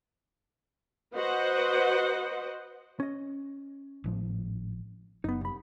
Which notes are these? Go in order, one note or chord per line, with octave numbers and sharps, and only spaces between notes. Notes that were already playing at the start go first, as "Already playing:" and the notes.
F#4 B4 C5 D#5 F#5
C#4 D#5
G#1 A2 F3
F#1 B3 D#4
C2 B5